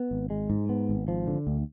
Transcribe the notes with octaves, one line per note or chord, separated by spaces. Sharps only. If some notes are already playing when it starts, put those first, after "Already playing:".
Already playing: B3
G#1
G#3
G#2
B3
G#1
F3
D3
D2